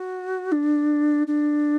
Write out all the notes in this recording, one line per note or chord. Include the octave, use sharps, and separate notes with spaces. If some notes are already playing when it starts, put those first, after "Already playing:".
Already playing: F#4
D4
D4